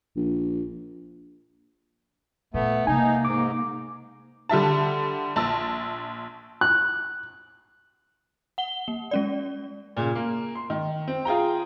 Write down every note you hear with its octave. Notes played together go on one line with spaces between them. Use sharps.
A#1
A#2 A3 B3
C3 G#3 A#3 D#4 G#5
G#2 D6
D3 G3 E5 A5
A#1 A5 E6
F#6
F#5 G7
A#3
G#3 C#4 D5
A#2 C#3
A#3
C6
D#3
C4
F4 G#4 G5 A#5